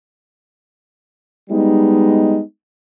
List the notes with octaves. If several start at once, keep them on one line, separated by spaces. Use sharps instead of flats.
G3 G#3 B3 D#4